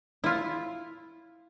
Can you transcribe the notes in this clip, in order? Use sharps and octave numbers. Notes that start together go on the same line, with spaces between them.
E4 F4